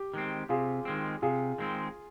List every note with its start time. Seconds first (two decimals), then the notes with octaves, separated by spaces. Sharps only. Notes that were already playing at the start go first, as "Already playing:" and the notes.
Already playing: G4
0.14 D#3 G#3 C4
0.49 C3 F4 G#4
0.85 D#3 G#3 C4
1.22 C3 F4 G#4
1.58 D#3 G#3 C4